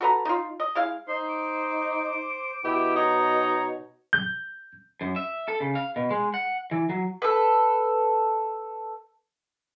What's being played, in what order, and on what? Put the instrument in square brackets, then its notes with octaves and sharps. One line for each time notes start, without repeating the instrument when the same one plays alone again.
[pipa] F#4 A4 B4 A#5
D#4 F4
D#5
G#3 E4 F5
[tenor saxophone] D#4 [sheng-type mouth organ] C5 [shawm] C6
[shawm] D6
[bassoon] B2 [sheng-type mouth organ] E4 E5 G5 [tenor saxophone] G4
[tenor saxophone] D#4 [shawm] C#5 [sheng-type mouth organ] A#5
[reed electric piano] G6
[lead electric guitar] F#2
E5
A4
C#3
F5
B2
G#3
F#5
E3
F#3
[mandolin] A4 B4